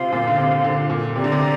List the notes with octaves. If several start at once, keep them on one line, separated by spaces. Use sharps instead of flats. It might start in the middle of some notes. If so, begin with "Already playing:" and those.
Already playing: C3 F4 C5 F5 C6
A#2
D3
C3
D3
A#2
C3 G4 D5 A#5
D3
C3